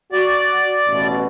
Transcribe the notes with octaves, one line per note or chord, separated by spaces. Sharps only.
F#4 D5
A1 E2 B2